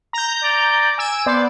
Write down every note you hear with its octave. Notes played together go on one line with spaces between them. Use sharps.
A#5 G6
D5
G#5 E6 D7
B3 C5 D5